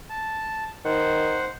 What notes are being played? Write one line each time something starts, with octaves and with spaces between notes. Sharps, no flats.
A5
D#3 C5 F#5